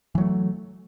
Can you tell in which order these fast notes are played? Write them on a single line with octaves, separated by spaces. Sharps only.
E3 F#3 A3